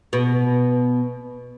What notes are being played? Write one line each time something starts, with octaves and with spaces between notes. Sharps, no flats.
B2